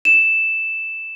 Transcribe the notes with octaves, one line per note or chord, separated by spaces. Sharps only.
E7